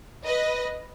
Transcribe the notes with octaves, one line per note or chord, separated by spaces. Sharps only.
B4 D#5